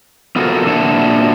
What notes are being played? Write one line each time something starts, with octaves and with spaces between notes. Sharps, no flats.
B3 F4 F#4 A4 A#4
A#2 F#3 D4 E4 F#5 A5